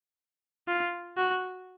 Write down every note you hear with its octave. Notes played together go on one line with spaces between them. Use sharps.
F4
F#4